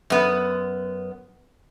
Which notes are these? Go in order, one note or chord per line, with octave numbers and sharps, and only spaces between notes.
F#2 B3